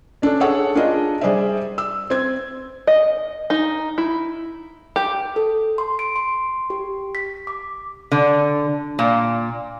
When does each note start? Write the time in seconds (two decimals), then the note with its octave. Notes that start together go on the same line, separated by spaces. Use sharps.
0.22 C#4 D4 A4
0.40 G#4 A4 C#5 F#5 E6
0.75 D4 F4 G#4 A#4 D#5
1.21 G3 G#4 C5 D5 E5
1.78 E6
2.10 C4 G#6
2.87 D#5
3.50 D#4
3.98 E4
4.96 G4
5.36 A4
5.78 C6
5.99 D7
6.16 C6
6.70 G4
7.15 B6
7.47 D6
8.12 D3
8.99 A#2